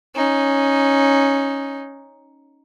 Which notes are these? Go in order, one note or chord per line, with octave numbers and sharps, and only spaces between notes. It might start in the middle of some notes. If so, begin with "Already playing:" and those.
C#4 D#4